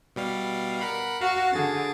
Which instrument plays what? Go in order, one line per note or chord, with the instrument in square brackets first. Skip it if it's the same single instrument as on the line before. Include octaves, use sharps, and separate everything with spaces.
[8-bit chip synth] B2 G3 F5
A#4 F#5 B5
[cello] F#4 [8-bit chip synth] F5
[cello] D3 [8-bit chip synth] G#4 A6